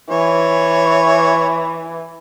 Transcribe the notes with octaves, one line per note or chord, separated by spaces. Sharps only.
E3 C#5